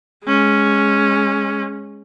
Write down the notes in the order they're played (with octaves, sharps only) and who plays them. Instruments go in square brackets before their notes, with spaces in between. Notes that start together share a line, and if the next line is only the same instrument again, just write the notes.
[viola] G#3 C#4